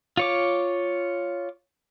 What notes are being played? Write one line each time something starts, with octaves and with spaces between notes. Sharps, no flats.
F4 C#5 D6